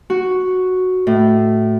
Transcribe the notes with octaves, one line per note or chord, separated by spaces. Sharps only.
F#4
A2